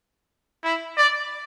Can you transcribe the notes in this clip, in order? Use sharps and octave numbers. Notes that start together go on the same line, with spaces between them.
E4
D5